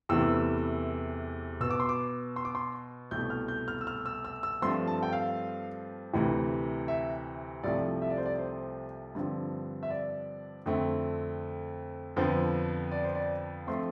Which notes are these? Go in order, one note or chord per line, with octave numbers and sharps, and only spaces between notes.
E2 C3 E3 A3 E6
B2 B3 E6
D6
C6
D6
C6
D6
C6
C2 B2 A3 G6
F6
G6
F6
E6
F6
E6
E6
E6
G2 F3 A3 C4 C6
A5
G5
F5
D2 C3 E3
E5
C2 C3 F3 A3 D5
E5
D5
C5
D5
C5
G2 D3 F3 C4
E5
D5
F2 D3 A3 C4
F2 D3 F3 B3 C5
D5
C5
D5
F3 A3 C4 C6